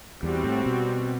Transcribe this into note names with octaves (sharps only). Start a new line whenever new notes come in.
E2 G3 C4 F#4
A2
B2